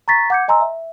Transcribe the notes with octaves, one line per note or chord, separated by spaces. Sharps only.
A#5 C#6 A6 B6
F#5 D6 G6 G#6 C#7
D#5 G#5 A#5 C6 E6
E5